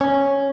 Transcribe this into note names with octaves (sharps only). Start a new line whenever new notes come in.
C#4